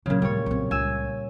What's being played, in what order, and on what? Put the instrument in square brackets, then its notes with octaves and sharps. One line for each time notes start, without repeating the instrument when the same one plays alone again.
[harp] A#2 C#3 [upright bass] F#3 C#4
[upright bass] D1 F3 [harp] G3 C#5
[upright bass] B1 C4
[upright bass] C#2 [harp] G#5 E6